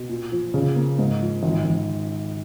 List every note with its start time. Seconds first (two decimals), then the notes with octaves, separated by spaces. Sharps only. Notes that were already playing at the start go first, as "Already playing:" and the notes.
Already playing: B2
0.09 A#2
0.32 F3
0.54 C#3
0.76 A#3
0.99 G#2
1.21 F3
1.43 G#1
1.65 G#1